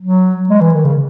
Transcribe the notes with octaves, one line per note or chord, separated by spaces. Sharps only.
F#3
G#3
E3
D#3
C#3